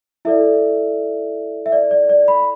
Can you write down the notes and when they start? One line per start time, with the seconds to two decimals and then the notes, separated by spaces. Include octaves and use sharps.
0.25 E4 A4 D5 E5
1.66 E5
1.72 D5
1.91 D5
2.09 D5
2.28 B5